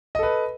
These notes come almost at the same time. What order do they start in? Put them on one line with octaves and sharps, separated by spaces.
D#5 A4 B4